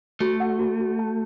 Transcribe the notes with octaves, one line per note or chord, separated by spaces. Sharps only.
A3 F#4
F#5
F#4
F#4
A5